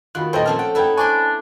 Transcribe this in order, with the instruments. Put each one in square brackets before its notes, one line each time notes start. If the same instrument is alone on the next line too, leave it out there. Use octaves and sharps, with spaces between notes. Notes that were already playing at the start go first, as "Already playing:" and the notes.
[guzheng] D#3 [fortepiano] F4 F#4 B5 [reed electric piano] F#6
[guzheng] A#2 A#3 [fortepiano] A4 D#5 [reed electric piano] B4 C5 G5
[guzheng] F3 A3 C#4 [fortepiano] C4 A5 F6
[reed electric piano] F#5 [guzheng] G5
[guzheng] D#4 E4 B4 [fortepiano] A4 G5
[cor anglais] D4 [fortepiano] C5 C#6 [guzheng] D5 F#5 C6 [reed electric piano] G#5